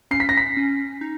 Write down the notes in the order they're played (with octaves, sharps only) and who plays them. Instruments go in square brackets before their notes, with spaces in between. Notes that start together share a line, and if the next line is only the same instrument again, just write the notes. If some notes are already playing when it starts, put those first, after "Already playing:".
[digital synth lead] C#4 [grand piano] C7
[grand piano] B6
A#6
B6
[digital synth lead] C#4
D#4